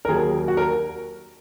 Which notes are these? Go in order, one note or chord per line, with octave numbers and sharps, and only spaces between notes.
A#4
D#2 D#3 F#3 G#4
F#4
A#4